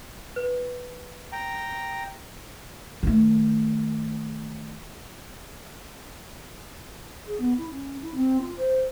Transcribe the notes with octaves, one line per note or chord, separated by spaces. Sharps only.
B4
G5 A#5
D#3 A3
G#4
B3
E4
C#4
E4
C4
F4
C5